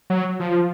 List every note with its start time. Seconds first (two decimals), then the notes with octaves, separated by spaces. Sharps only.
0.10 F#3
0.40 F3